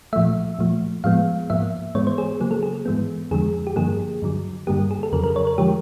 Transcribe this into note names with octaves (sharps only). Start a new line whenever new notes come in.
A#2 F3 A3 E5
A#2 F3 A3
A2 F3 G#3 B3 F5
G#2 F3 A#3 E5
G#2 E3 G#3 B3 C#5
C5
G#4
C#3 F#3 A#3 G#4
A4
G#4
G#2 E3 G#3 B3
F2 D3 F3 G#3 G#4
G4
G2 D3 F3 A#3 G#4
G2 D3 F#3
G2 D3 G3 A#3 G4
G#4
A4
F2 C#3 F#3 A#4
A#4
C#5
A#4
D3 F3 G#3 G4